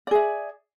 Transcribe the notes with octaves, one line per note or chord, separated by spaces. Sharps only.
G#4 D5 E5